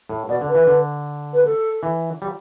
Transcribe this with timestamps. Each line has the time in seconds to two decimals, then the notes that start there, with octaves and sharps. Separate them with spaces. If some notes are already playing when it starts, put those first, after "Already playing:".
0.09 A2
0.29 B2 D5
0.41 D3
0.48 B4
0.55 E3
0.67 D3
1.33 B4
1.45 A4
1.83 E3
2.22 G3